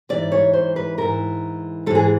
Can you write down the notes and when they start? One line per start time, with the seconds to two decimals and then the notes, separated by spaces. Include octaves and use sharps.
0.09 G#2 E3 D5
0.32 C#5
0.53 C5
0.76 B4
0.98 G#2 E3 A#4
1.86 G#2 A4
1.91 E3 G#4